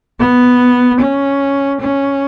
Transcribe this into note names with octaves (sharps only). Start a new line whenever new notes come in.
B3
C#4
C#4